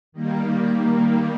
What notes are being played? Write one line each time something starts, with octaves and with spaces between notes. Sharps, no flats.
D#3 G3 A#3